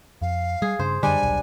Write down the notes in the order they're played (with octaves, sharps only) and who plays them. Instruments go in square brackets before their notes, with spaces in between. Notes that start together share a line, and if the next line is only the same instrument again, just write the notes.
[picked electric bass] F2 [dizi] F5
[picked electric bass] G3 [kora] G#4
[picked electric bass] G2 C#3 D4 [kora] C5
[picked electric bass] F#2 D3 [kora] G3 D4 [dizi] G#5
[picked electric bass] D#1 B1